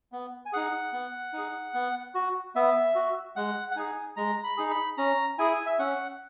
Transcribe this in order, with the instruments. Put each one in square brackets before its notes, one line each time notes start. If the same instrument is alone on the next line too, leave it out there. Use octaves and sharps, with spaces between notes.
[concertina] B3
G#5
D#4 G#4 F#5
B3
D#4 G#4
B3
F#4
B3 E5
F#4
G#3 F#5
F#5
D#4 G#4 G#5
G#3 A#5
B5
D#4 G#4
B5
C#4 A#5
E4 G#4 G#5
E5
C#4 F#5